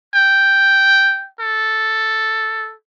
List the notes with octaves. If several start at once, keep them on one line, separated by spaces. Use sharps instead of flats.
G5
A4